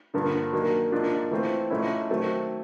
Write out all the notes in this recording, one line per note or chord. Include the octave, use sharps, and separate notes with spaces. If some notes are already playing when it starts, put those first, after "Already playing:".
G2 D3 F3 A#3
D#3 F#3 A#3 D4
G#2 F3 A#3 D4 F4
E3 A3 C4 F4
G#2 F3 A3 C#4 E4
D#3 F#3 A3 C4